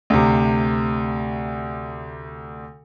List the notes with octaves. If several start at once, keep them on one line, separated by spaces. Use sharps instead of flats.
D2 C3